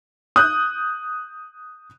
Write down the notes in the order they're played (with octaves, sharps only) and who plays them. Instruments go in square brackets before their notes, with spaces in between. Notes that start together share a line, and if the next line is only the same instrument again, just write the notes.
[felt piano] D#6 F#6 G6